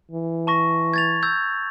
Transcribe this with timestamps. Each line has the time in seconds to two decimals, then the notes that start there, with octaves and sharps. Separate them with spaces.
0.12 E3
0.47 A5 C#6 A#6
0.94 G#6 A6 F7
1.23 E6 G6 G#6